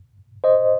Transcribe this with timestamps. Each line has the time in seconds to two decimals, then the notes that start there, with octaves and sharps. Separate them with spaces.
0.44 C5 D#5